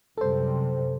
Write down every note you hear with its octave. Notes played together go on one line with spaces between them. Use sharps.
F#2 C3 G3 A4 C5